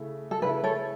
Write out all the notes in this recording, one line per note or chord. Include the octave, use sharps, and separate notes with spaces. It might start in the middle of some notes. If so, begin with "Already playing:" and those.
Already playing: C#3 A3 E4
A4
C#3 A3 E4 B4
A4 C#5